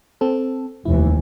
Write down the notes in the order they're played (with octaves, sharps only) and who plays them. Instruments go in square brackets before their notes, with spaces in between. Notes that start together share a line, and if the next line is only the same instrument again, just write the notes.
[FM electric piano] C4 A4
[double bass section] F1 D#2 E3 [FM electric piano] E4